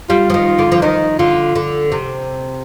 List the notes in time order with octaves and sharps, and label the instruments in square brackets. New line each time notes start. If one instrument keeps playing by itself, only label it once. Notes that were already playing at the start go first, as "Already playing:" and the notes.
[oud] G3 [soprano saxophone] F4
[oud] F3
D#3
D3
F3
[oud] D#3 [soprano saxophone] D#4
[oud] D3 [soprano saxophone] F4
[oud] D3
C3